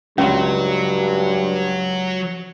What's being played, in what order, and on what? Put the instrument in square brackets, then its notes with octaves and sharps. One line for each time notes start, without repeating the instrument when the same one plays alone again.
[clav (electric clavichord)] C#2 [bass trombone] G2 [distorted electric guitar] F#3 [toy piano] C#4